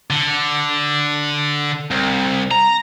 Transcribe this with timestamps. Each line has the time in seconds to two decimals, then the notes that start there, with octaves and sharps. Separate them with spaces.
0.10 D3
1.90 C2
2.51 A#5